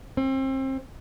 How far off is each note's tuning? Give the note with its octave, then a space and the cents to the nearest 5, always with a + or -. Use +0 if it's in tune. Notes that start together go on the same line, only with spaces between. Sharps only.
C4 +30